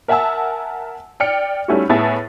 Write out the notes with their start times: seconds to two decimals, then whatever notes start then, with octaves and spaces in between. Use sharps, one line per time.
0.08 A#4 E5 F#5 G#5 A5 E6
1.20 D5 G5 F6 C#7
1.68 G3 A3 C#4 D#4 E4 F#4
1.90 A2 B3 G#4 E5 A5 A6